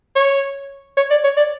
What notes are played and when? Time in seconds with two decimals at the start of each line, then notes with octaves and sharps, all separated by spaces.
0.16 C#5
0.97 C#5
1.11 D5
1.24 C#5
1.37 D5